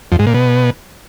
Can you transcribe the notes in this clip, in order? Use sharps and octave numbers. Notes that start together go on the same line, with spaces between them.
F2
G#2
A#2
B2